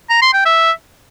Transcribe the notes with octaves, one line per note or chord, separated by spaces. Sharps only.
A#5
C6
G5
E5